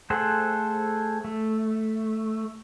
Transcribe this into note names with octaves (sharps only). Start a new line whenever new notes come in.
A3 G#4 A4 C5 F#5
A3